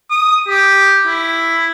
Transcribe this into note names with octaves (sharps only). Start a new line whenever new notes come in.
D#6
G4
E4